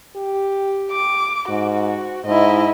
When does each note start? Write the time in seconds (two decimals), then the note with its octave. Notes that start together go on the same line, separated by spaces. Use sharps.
0.16 G4
0.91 D6
1.49 G#2 F#4
2.26 G#2 E4 D#5